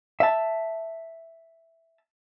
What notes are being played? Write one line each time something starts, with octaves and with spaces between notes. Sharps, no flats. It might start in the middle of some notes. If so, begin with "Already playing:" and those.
E5 A5